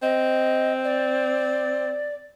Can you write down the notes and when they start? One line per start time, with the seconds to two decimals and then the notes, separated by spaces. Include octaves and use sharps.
0.02 C4 D#5
0.84 D5